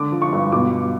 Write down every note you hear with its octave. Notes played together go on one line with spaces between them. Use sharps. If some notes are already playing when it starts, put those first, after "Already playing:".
Already playing: D3 D6
F3
C#6
G2
B2 D6